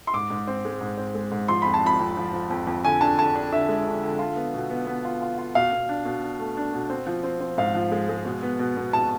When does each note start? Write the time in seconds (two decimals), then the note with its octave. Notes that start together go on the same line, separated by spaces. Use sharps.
0.07 C6
0.13 G#2 D6
0.30 G#2
0.47 C4
0.65 G#3
0.81 G#2
0.98 C4
1.15 G#3
1.31 G#2
1.48 F3 C6
1.62 F2 B5
1.74 A5
1.83 F3 B5
1.99 F2
2.17 F3
2.33 F3
2.50 F2
2.67 F2
2.84 D3 G#5
3.01 D4 A5
3.18 D3 A5
3.35 D4
3.53 D3 E5
3.69 G#3
3.86 D3
4.03 D3
4.19 F4
4.36 B3
4.54 B2
4.70 B3
4.87 B3
5.05 F4
5.22 F4
5.38 F4
5.55 B2 F5
5.72 B2
5.89 D4
6.05 B2
6.23 D4
6.39 A3
6.57 D4
6.73 B2
6.90 C4
7.07 F3
7.24 C4
7.40 C4
7.58 G#2 F5
7.75 F3
7.92 G#3
8.09 G#3
8.25 B2
8.43 B3
8.59 B2
8.77 B2
8.93 B2 A5